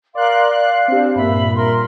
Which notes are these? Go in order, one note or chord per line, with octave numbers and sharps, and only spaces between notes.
A#4 D5 F5 C6 F#6
F5
C4 D4 G4
G2 A#2 E5 B5
A#4 C6